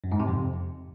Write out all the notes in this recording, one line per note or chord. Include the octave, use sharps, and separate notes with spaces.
F#2
G#2
C3
F2